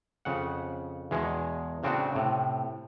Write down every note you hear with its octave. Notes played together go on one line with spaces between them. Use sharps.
F2 C#3 F#5
E2 B2 G#3
A2 C#3 C4 D4 F#4
A2 C3